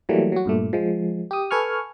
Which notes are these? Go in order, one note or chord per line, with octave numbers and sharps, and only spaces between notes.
E3 F#3 G3 A3 A#3
F#3 F#4
G2 A#2 A3
F3 G#3
G4 D#6
A4 B4 G#5 C#6 F6